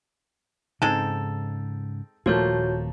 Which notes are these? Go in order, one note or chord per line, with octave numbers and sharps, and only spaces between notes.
G#2 C#3 G#3 C4 D#4 A4
D#1 A#2 F3 A3 A#3 F#4 C#5 G6